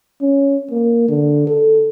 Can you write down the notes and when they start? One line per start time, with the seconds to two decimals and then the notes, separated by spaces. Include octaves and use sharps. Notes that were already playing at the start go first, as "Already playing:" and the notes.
0.21 C#4
0.71 A#3
1.09 D3
1.47 A4